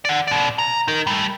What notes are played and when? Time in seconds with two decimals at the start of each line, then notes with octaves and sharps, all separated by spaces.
0.05 D5 F#5
0.28 B2 D5
0.59 A#5
0.88 D#4 A#4
1.07 G3 A3